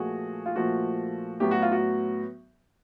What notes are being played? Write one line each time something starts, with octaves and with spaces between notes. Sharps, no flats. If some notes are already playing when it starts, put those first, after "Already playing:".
Already playing: A#2 F3 A3 F#4 G#4
F4
A#2 F3 A3 F#4
A2 F#3 B3 G4
F#4
F4
F#4